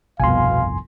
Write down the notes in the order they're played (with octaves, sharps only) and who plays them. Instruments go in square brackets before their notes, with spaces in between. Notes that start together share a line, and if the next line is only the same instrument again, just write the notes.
[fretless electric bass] G1 C2 F2 [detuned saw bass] B2 [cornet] F5 [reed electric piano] G#5 C6